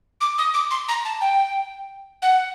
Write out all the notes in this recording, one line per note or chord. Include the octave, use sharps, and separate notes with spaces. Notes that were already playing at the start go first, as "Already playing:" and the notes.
D6
D#6
D6
C6
A#5
A5
G5
F#5